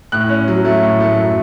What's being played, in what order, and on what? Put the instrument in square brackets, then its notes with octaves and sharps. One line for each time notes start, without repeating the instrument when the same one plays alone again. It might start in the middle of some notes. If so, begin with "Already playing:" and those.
[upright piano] A2 F#6
C#4
F#3
A3
A2
A3
F#2